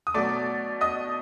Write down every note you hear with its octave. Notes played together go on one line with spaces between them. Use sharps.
D#6
B2 F#3 A3 D5 D6
D#5 D#6